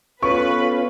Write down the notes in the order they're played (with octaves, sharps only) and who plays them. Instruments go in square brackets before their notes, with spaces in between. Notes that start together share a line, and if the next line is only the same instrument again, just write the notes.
[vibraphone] B3 A4 [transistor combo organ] C#4 F4 [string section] B4 [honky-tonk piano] C#6